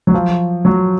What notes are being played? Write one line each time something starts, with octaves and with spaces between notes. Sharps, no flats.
F#3
F3
F#3